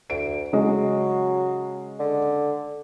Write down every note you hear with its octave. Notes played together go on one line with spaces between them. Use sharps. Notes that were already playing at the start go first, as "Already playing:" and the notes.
D2 D7
C#3 F#3 G#3
D3